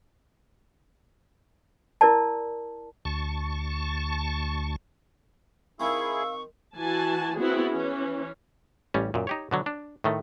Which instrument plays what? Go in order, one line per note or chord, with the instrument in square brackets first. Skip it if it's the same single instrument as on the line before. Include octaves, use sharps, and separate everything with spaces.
[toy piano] E4 A#4 D5 A5
[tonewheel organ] D2 A5 C#6
[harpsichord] D#3 C4 [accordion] E4 G#4 [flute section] F5 E6 [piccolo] C#6
[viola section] E3 F#4 G#5 A5
B3 C4 E4 F#4 G#4
E3 C#4
[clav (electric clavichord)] A1 G3 C#4
F#2 A#2
D#4 G4 C#5
B2 D3 F#3
D4
A2 D#3 A3